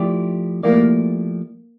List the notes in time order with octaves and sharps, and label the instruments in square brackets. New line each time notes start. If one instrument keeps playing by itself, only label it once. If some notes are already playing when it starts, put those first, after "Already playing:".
Already playing: [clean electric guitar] F3 A3 E4 G4 D5
[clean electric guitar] F3 A3 E4 G4 D5 [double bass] A#3